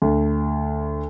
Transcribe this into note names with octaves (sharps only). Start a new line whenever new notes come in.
D2